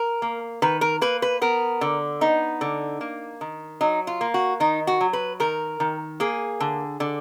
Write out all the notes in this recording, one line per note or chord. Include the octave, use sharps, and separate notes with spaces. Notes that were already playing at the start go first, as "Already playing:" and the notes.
Already playing: A#4
A#3
D#3 B4
A#4
A#3 B4
B4
B3 A#4
D3
B3 D#4
D3
A#3
D#3
F#3 D#4
F4
A#3
F#4
D#3 D#4
F#4
F#3
B4
D#3 A#4
D#3
A#3 G#4
D3
D3